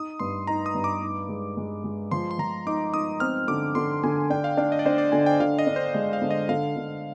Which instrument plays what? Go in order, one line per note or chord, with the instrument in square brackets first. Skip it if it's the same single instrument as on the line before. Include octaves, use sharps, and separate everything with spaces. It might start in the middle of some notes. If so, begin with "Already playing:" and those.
Already playing: [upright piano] D#4 [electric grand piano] D#6
[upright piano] G2 [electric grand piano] C6
[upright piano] D#4 [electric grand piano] A#5
[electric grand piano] D#6
[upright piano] G2
[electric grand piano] D6
[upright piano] D#4
G#3
G#3
G#3
[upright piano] F3 [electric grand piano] C6
[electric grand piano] C6
[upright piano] F3 [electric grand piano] A#5
[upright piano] D#4 [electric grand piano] D6
[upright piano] D#4 [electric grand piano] D#6
[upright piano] C4 [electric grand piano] F6
[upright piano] D3 [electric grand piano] D6
[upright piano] D3 [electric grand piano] C6
[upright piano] D3 [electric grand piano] G#5
[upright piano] D4 [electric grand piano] G5
[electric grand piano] F5
[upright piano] D4 [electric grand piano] F5
[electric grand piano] D#5
D5
[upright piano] D4 [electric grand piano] C5
[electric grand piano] D5
[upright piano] D3 [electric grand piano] G#5
[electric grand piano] G5
[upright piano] D3 [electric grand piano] F5
[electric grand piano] D#5
[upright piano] D4
[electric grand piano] C5
[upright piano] G#3 [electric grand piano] D#5
[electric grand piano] F5
[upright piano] D3
[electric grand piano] D#5
[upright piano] D3 [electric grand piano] F5
[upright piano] D3